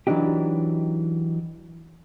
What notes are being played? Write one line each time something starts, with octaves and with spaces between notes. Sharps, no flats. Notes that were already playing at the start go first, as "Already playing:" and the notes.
E3 F#3 D4 D#4 G4